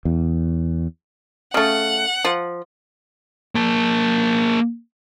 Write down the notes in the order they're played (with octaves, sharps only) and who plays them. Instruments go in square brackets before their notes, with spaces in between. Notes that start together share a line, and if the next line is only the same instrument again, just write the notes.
[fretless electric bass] E2
[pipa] C#3 A3 [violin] F#5
[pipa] F3
[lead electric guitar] A#3 A5